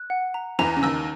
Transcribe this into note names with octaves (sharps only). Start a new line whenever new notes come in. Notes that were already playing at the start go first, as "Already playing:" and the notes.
Already playing: F#6
F#5
A#5
E2 E3 A#5
C#3
D#2 D#3 E6